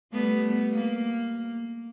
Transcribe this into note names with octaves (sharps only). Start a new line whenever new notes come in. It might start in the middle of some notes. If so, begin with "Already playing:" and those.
G3 A3 B3
A#3